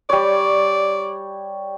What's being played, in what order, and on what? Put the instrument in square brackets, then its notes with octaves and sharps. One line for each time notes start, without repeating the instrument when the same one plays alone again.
[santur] G3 C#5 [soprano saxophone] D5